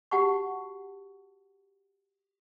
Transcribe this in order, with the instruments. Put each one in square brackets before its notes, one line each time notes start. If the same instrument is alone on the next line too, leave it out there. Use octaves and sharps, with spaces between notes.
[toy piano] F#4 G4 F#5 A5 C#6